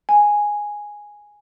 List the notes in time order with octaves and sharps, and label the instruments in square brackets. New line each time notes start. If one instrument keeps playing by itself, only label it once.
[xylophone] G#5